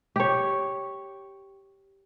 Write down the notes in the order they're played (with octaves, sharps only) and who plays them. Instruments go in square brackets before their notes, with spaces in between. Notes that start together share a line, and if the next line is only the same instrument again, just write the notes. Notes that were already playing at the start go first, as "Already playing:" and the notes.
[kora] G4 C#5